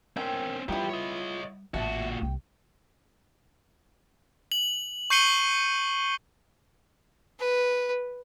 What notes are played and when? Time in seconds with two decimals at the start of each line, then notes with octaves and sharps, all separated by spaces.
0.17 C4 C#4 A#4 G5
0.69 G3 B3 E4 F4 G4 C#5
0.89 C#5 D#5
1.74 A1 A#2 F#4 E5 A5
2.22 C2 G5
4.52 F#7
5.10 C#6 G6 C7 C#7 D#7 G7
7.39 B4